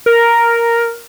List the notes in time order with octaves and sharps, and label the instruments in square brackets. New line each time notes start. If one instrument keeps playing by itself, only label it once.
[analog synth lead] A#4